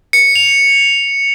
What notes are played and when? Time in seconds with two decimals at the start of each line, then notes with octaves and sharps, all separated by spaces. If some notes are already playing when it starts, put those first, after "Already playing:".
0.13 C#7
0.36 F7